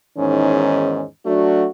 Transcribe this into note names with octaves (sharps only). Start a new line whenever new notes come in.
E2 G#2 D#3 C#4
F#3 A3 D4 F#4